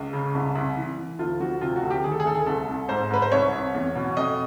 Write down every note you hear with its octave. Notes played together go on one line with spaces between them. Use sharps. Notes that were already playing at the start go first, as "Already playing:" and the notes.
Already playing: C#2
C#3
C2
C2
E3
E3
D2 F4
F3 F#4
C3 F4
F#4
D2
G4
D#3 G#4
A4
G#4
D2 A4
G#4
C2 A4
C2
G#2 C5
G#2 B4
C5
C2 C#5
C2
E2
B2
F2 D#5